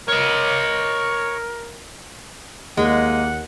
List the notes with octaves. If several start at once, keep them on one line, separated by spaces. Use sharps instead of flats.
A#4 C#5 D#5
D#2 G#3 A#3 F#5